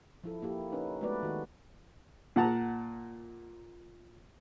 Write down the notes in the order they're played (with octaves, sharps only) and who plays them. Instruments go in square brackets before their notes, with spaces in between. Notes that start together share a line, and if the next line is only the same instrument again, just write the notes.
[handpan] F3 E4 A4
A#3 E4 G4
C#4 D#4 B4
G#3 A3 B3 F#4 B4 D5
D#3 F#4
[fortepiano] A#2 F#5 A5 A#5